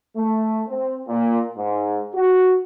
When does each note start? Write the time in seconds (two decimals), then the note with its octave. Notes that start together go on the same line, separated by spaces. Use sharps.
0.17 A3
0.68 C4
1.08 A#2
1.57 G#2
2.15 F#4